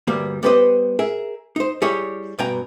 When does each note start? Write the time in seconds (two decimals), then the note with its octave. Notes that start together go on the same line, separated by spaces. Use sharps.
0.07 D2 G2 G3 A#3
0.43 G3 B3 G4 B4 C5 D#5
0.99 G#4 A#4 E5
1.56 D#4 C5
1.82 G3 E4 G4 G#4 C#5
2.39 G2 B2 G5 G#5 A#5